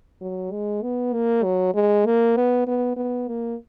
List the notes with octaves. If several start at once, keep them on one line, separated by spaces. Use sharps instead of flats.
F#3
G#3
B3
A#3
F#3
G#3
A#3
B3
B3
B3
A#3